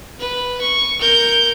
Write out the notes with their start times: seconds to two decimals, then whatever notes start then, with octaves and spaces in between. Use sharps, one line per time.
0.20 B4
0.62 C#6
1.00 A#4 G6